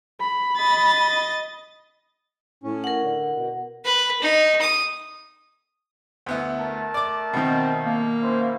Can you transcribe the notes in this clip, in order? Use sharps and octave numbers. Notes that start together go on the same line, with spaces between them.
B5
D#5 A6
A2 C#4
A#4 F#5
D3
B2
B4
D#4
D#6
D2 B3 E4
A3 A#4 A5
D5 D6
B2 D#3 C4
A#3
C#4 E4 C5